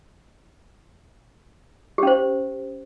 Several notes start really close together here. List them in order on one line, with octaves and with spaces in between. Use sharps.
G4 C#4 C5